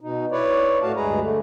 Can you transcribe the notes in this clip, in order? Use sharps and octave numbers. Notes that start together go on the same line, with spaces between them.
B2 D#4
E4 B4 C#5 D5
A2 A3 F#4 F5 A5
D2 G2 G#3 G#4 B4 A#5
D3 A3